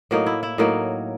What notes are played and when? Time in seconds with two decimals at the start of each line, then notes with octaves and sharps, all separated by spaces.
0.11 A2 F#3 A#3 D#4
0.26 E4
0.43 E4
0.58 A2 F#3 A#3 D#4